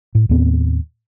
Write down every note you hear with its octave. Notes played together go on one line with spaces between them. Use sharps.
A2
D#2 A2 B3 C4